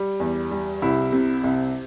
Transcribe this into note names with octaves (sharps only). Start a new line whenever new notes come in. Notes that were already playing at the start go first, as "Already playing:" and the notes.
Already playing: G3
E2
G3
C2 E4
C3
C2